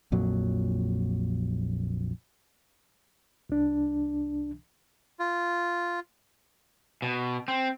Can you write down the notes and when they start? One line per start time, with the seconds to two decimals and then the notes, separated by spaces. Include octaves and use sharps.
0.12 A#1 F2 A#2 F#3
3.50 C2 D4
5.19 F4
7.02 B2
7.48 C4